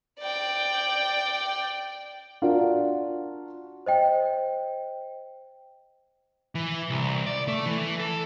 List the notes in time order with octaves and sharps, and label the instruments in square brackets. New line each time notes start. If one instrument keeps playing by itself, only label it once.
[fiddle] D5 G5
[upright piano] D4 F4 F#4 A#4
[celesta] C5 D#5 G5
[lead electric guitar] E3
C2
D5
A3
E3
A4